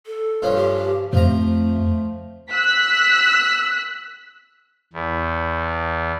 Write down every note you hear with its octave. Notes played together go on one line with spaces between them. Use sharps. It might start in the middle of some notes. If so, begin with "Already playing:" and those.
A4
G2 F3 C#4
G4
F2 F3 A3 A#5
E6 F#6 B6
E2